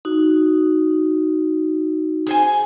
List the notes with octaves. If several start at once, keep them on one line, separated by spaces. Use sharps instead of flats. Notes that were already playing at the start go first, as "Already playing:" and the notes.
D#4 F#4
G#4 C5 G#5